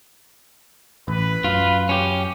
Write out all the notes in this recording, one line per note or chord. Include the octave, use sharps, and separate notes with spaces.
A1 B4
F#2 F4
C#4 G4